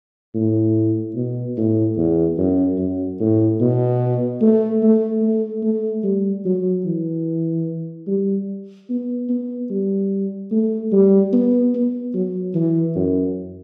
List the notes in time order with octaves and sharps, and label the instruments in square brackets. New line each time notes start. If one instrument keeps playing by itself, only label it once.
[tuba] A2
B2
A2
E2
F#2
F#2
A2
B2
A3
A3
A3
A3
G3
F#3
E3
G3
B3
B3
G3
A3
G3
B3
B3
F#3
E3
F#2